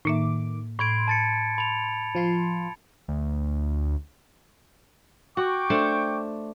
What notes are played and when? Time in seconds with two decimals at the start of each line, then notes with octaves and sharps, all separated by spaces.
0.05 A2 D#3 A#3 E5 D6
0.79 A2 B5 C6 G#6 D7
1.08 A5 A6 C#7
1.58 B5 F7
2.15 F3 F4 C6
3.08 D2
5.37 F#4 G5 C#6 D6
5.70 A3 D4 C5